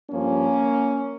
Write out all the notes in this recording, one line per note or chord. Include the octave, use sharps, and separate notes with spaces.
G2 F3 A#3 C#4